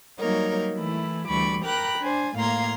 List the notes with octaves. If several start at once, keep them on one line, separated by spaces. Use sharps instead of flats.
F#3 G3 A#3 D#4 A#4 C#5
E3 A3 E4
D2 E3 G3 B5 C#6 D6
A#4 G5 A#5 B5 D6 F#6
D4 C5 G#5
A2 A#3 F5 A#5 C6 G#6